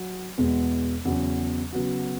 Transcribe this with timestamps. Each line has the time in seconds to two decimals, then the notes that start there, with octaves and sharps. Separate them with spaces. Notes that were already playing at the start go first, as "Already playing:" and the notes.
Already playing: F#3
0.38 E2 B2 G#3 B3
1.05 E2 C#3 F#3 C#4
1.73 C#3 F#3 B3 F#4